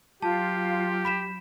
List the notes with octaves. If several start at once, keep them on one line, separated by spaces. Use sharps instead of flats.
F#3 F4 G4 A5
B5 B6 E7